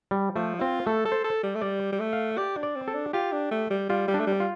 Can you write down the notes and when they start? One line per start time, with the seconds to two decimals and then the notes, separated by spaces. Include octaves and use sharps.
0.11 G3
0.36 F3 A3
0.61 C4 F4
0.86 A3 A4
1.05 A4
1.12 C5
1.24 A4
1.43 G3
1.55 A3
1.62 G3 D5
1.92 G3
2.00 A3
2.13 F5
2.38 G4 D5
2.57 D4
2.63 D5
2.76 C4
2.88 A4
2.94 D4
3.13 F4 G4
3.32 D4
3.51 A3
3.70 G3
3.89 G3 F4
4.08 G3
4.14 D4
4.20 A3
4.27 G3
4.40 F4